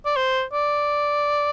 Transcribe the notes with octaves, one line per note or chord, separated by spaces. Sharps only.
D5
C5
D5